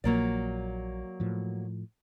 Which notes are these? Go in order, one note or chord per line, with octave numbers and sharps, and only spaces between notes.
A#1 A#2 F3 F#3 A#3 D5
A2 F3